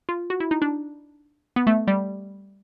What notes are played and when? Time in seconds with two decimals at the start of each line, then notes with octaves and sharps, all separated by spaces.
0.09 F4
0.30 F#4
0.40 E4
0.51 D#4
0.62 D4
1.56 B3
1.67 A3
1.88 G3